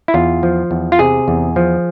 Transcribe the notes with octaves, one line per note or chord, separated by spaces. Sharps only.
E4
E2 F4
F3
E2
F4
C3 G#4
E2
F3